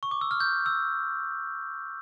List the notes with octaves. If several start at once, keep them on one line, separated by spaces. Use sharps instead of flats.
C#6
D6
E6
F6
G6
E6